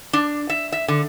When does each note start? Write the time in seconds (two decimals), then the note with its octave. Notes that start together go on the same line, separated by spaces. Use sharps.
0.13 D4
0.50 E5
0.72 E5
0.88 D3